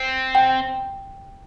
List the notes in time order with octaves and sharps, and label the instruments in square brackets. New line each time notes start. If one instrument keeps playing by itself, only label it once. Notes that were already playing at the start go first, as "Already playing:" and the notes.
Already playing: [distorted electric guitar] C4
[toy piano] G5